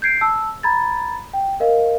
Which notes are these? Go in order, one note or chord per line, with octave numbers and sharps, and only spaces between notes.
G6 G#6 C7 D7
A5 E6
A#5 B5 G#6 A6
G5
A#4 D#5 F5